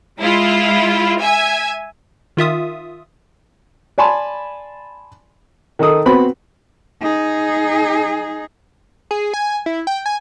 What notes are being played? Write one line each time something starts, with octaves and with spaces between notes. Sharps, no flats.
G#3 E4 F4
E5 G#5
D#3 F4 E5 D#6
D5 G#5 A5 B5 C6
D#3 D#4 A4 D#6
B3 C4 F#4 C5 B5
D#4 G#4
G#4
G#5
E4
G5
G#5